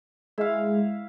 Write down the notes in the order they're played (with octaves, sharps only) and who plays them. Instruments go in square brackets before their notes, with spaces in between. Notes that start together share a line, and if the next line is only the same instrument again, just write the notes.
[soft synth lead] G#3 [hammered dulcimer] E4 F5